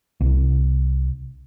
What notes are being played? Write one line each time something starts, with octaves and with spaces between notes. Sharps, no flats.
C2